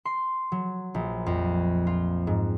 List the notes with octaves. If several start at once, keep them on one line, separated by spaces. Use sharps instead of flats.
C6
F#3
A#1
F2
F4
G#2